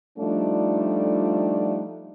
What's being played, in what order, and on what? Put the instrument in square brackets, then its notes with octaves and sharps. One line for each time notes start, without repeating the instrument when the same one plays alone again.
[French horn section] F3 G3 A3 D4 D#4 F4